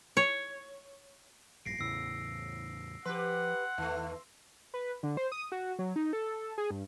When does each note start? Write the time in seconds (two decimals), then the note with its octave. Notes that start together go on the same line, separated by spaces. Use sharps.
0.17 C#5
1.65 A#1 G2 A#6 C7 D7
1.79 E2 A2 C#3 E6 C7
3.06 F3 G4 B4 F#5 C6
3.78 E2 D#3 A3
4.74 B4
5.03 D3
5.17 C5
5.32 D#6
5.52 F#4
5.79 F#3
5.96 D#4
6.13 A4
6.58 G#4
6.71 G2